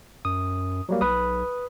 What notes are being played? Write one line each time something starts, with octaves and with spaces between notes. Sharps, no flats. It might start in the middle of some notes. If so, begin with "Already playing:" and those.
F#2 D#6
F#3 G3 A#3
B1 B4 B5 D#6